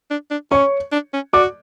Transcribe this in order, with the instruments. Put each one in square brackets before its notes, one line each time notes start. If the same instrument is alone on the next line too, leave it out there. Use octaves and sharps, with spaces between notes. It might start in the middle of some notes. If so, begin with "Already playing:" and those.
[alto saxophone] D4
D4
[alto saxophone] C#4 [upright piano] C#5 C#6
[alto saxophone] D4
C#4
[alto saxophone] F#4 [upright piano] D5 D6